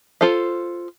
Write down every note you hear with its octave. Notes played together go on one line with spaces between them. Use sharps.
F4 A4 C5 F5